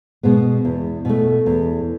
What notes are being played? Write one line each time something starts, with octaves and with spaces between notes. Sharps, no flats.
B2 G#3 B3
E2
B2 A3
E2